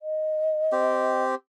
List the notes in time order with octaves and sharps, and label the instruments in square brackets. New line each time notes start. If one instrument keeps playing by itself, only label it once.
[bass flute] D#5
[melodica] C4 G4